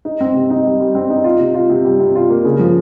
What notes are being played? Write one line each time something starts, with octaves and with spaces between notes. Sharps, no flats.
D#4
C4
C3
D#4
G3
G3
C4
D#4
F4
C3
F4
C3
G3
C3
F4
A#3
C#3
F3